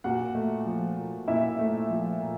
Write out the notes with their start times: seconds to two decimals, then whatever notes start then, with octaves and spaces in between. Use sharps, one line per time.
0.04 A#2 F#4 F#5
0.35 A3
0.66 F3
0.97 A#2
1.28 A#2 E4 E5
1.59 A3
1.89 F3
2.20 A#2